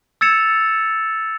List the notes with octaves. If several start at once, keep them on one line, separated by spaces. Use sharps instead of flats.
E6 G#6 A6 C#7 E7 F7